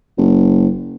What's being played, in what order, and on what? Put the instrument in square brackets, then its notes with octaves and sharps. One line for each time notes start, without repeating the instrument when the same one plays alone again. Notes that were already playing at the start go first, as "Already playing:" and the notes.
[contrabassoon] F#1